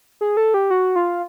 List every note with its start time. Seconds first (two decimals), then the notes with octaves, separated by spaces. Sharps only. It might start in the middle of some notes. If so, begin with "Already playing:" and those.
0.21 G#4
0.37 A4
0.54 G4
0.70 F#4
0.96 F4